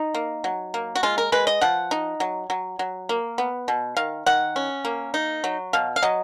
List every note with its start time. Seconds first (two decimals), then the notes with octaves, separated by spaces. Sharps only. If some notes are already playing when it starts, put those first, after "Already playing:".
Already playing: D#4
0.14 A#3
0.44 F#3
0.74 A#3
0.95 F#4
1.03 G#3 F4
1.18 A#4
1.32 G#3 B4
1.47 D#5
1.61 F3 F#5
1.91 D#4
2.20 F#3
2.50 F#3
2.79 F#3
3.09 A#3
3.38 B3
3.68 B2
3.97 D#3 F5
4.26 D#3 F#5
4.56 C#4
4.85 A#3
5.14 D#4
5.44 F#3
5.73 B2 F5
5.96 F5
6.03 F#3 D#5